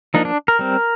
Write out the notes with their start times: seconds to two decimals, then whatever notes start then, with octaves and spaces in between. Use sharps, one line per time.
0.14 F3 A#3 D4 D#4
0.25 D4
0.48 A#4
0.59 G3 C4